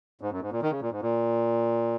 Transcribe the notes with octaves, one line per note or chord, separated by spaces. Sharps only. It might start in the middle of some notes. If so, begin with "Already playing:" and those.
G#2
F#2
G#2
A#2
D#3
C#3
A#2
G#2
A#2